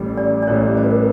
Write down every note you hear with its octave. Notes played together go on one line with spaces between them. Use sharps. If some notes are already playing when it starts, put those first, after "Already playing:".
Already playing: A1 A2 E3 G3
D5
D5
A1 A2 E3 G3 C#5
C5
B4
A#4